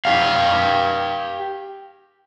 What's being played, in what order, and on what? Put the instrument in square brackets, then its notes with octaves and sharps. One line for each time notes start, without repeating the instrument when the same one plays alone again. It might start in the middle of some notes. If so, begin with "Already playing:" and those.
[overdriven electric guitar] G4 F5